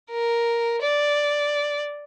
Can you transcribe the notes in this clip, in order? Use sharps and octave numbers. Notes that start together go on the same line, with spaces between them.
A#4
D5